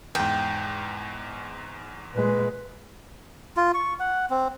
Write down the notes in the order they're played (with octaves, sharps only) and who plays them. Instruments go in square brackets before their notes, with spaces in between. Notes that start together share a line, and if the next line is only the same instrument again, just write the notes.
[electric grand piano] E2 G#2 [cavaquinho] G5
[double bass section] A#2 G#3 [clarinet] B4
[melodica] F4
C#6
F#5
C4